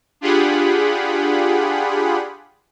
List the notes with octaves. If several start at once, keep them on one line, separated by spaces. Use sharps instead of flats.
D4 F4 G4 G#4 F#5 B5